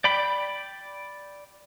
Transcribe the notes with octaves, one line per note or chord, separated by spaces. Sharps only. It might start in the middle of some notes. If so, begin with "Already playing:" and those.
D5 G5 B5